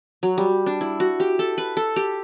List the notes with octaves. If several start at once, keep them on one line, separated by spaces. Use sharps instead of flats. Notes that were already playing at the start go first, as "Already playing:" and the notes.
F#3
G3
D4
E4
F#4
G4
A4
B4
A4
G4